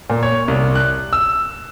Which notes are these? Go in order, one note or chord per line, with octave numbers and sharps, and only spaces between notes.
A#2
C#5
C2
F#6
E6